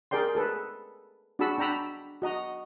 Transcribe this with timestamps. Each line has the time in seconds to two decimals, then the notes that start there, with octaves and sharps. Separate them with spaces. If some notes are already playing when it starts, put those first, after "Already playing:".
0.11 G#4 A#4 D5 G5 C6
0.35 G#4 A4 B4
1.39 D4 F#4 G#4 A5 B5 E6
1.58 D4 G5 A#5 B5 E6
2.22 F#4 D#5 A#5